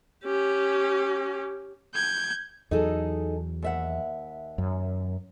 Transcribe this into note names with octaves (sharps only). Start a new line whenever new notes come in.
C#4 G4
G6 G#6
E2 F#3 D#4 G#4 A4
D#2 E5 F#5
F#2